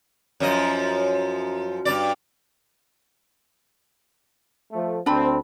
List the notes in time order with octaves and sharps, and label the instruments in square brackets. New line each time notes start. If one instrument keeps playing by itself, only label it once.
[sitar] F#2 F3 D#5
G2 B2 D5
[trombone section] F3 A3
[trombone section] D2 C4 [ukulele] D4 B5